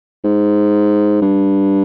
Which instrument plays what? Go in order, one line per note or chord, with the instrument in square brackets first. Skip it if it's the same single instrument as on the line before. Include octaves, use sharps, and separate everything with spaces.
[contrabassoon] G#2
G2